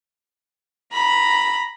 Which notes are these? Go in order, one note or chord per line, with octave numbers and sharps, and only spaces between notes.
A#5 B5